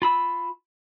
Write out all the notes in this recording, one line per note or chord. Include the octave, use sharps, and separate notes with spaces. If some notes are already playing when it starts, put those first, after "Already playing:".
F4 B5 E6